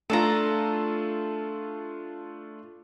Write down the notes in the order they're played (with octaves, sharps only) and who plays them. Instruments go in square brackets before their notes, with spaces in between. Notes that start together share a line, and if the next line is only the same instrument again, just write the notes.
[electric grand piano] A3 D4 F4 [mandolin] A4 A#5